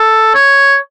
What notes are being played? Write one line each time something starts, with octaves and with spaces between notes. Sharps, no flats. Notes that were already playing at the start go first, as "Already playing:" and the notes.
Already playing: A4
C#5